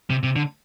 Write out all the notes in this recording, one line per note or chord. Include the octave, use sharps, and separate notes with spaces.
C3
C3
D3